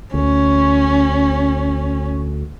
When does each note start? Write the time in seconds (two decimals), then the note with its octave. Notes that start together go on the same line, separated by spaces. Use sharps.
0.14 D2 C#4